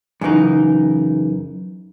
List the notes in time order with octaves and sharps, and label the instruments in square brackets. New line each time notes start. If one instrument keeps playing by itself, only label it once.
[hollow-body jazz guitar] F#2 C#3 E3 D#4